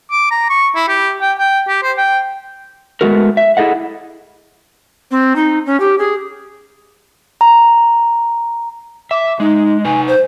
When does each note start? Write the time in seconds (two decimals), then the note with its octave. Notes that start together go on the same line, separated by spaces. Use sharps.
0.12 D6
0.31 A#5
0.50 C#6
0.76 E4
0.89 G4
1.22 G5
1.39 G5
1.68 G4
1.83 C5
1.98 G5
3.01 G#3 A3 B3 F#4 A#4
3.37 E5
3.57 E4 G#4 A4 D#5 F#5
5.11 C4
5.36 D#4
5.66 C#4
5.80 G4
5.98 G#4
7.41 A#5
9.11 E5 D6
9.40 G#3 D#4
9.85 D#4 B4 G#5
10.08 C5